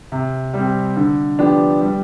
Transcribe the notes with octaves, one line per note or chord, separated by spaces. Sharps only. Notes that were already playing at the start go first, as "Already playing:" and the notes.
C3
G3 C4 G4
D3
F3 B3 D4 G4
G3